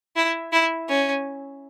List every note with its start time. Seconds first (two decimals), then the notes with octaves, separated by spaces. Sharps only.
0.16 E4
0.52 E4
0.88 C#4